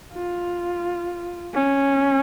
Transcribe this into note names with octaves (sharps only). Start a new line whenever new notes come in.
F4
C#4